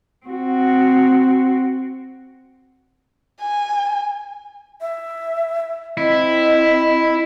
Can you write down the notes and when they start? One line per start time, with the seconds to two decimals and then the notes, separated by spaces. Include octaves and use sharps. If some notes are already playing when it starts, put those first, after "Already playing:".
0.26 C4 F#4
3.41 G#5
4.81 E5
5.97 C4 E4 D#5